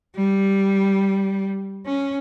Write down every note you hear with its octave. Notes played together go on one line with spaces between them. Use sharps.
G3
C#4